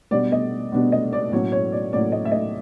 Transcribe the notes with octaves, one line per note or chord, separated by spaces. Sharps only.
B2 G3 B3 D4 D5
D#5
B2 G3 B3 D4
D#5
D5
A2 F#3 A#3 C#4 C#5
C#5
D5
A2 F#3 A#3 C#4 D5
D#5
E5
D#5